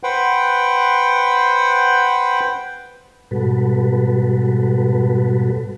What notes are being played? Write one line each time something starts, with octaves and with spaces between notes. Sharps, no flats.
B4 C5 F#5 G5
G#2 B2 G3 F#4 A4 B4